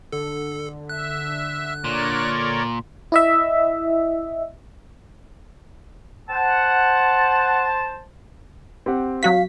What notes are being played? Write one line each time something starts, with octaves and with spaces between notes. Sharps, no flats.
D3 A4
E5 F#6
A#2 A#4 C#5 D5
E4 D#5 E5
C5 F#5 A5
C4 G4 F#5
F#3 F#4 F5 B6